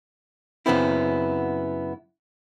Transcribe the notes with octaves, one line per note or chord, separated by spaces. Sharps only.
F#2 A#2 C#3 B3 C4 E4